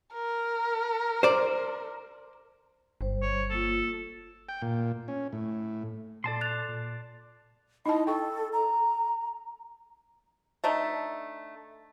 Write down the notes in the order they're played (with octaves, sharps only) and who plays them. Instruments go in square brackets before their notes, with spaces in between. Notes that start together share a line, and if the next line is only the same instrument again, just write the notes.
[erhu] A#4
[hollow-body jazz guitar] C5 D5
[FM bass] G1 [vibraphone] G3 C5
[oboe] C#5
[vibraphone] A#3 F4 [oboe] A4
[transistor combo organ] G5
A#2
C#4
A2
[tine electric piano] A#2 A4 [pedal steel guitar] D5 A5 C6
[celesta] F#6 A6 F7
[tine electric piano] A#2
[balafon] D#4 E4 A5 [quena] D#5
[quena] A4 [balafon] G5 C#6
[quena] A#5
[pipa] A3 D4 D#4